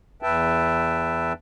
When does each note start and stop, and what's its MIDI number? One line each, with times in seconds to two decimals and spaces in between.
0.22 1.33 40
0.22 1.33 71
0.22 1.33 76
0.22 1.33 79
0.22 1.33 81